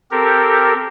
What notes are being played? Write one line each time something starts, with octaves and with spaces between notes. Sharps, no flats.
C4 G4 A4 A#4